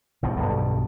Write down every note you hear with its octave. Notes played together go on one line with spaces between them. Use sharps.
G#1 B2 G3
B1 G2 B2 D3